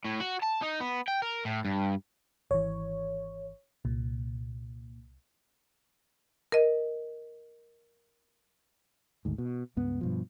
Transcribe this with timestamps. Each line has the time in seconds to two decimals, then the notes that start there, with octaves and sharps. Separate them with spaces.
0.05 A2
0.20 F#4
0.42 A5
0.62 D#4
0.80 B3
1.08 G5
1.22 A#4
1.45 A2
1.65 G2
2.51 G#1 E3 C#5
3.85 C2 A#2
6.52 A#4 D#5
9.25 G#1 D2 G#2
9.38 B2
9.77 C#2 G2 B3
10.01 G2 B2 F3